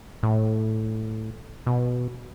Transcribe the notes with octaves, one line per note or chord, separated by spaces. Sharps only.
A2
B2